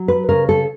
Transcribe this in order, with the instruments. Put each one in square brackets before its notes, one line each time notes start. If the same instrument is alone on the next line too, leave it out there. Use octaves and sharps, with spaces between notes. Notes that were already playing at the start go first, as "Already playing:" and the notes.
Already playing: [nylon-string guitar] F#3
B4
C#3 A#4
A4